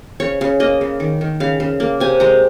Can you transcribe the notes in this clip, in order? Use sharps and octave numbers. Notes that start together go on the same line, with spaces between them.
C#3 C#5
C#3
A#3 D#5
C#3
D#3
D#3
C#3 F5
C#3
A#3
C3 G#5
G#3 A#5